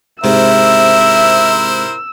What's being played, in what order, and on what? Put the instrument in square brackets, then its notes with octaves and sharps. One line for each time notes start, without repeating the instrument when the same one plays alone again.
[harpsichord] G#2 C3 [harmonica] E4 A#4 C5 [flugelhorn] E5 [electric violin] E6